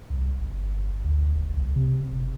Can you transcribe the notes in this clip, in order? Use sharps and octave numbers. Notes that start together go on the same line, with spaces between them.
C2
G1
D2
F#1
C2
C3
F#1